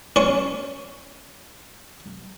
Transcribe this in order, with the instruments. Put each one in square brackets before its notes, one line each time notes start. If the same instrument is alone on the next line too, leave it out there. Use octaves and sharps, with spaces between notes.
[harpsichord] C#4 C#6